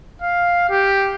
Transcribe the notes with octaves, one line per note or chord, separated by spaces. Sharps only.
F5
G4